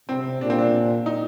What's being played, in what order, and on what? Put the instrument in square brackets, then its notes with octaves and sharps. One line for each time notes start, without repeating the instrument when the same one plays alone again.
[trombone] C3 [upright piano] C4
[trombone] A#2 [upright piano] D4
[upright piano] C4
D4
D#4